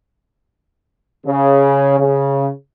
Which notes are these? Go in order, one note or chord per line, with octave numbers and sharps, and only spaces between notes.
C#3
C#3